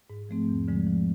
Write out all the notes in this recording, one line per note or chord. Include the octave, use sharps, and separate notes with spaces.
G#2
F3 A3 C4
E2
D3 F3 G#3
F3